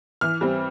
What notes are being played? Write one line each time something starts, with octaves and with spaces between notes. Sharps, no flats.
E3 F6
G3 C4